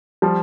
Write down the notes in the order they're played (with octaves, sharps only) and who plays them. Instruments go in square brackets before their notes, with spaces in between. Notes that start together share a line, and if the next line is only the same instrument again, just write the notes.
[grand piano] F3 G3